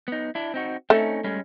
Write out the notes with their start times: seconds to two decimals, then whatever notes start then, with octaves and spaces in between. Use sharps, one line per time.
0.08 B3 D#4
0.35 D4 E4
0.54 C4 D#4 F#4
0.90 A3 C4 C#4 D#4
1.24 G3 G#3 C#4